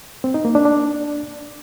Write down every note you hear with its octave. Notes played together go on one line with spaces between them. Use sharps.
C4
D#4
A#3
D4
D4